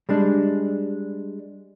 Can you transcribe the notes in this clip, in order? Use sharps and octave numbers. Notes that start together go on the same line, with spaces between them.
G3 G#3 D4